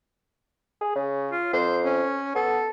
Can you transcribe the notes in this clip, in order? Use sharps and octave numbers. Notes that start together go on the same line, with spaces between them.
G#4
C#3
F4
F2 C5
C#4
B3 A4